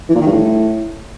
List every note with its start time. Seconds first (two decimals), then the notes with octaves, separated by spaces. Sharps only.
0.09 E3
0.15 A#2
0.21 D#3
0.26 G2
0.32 A2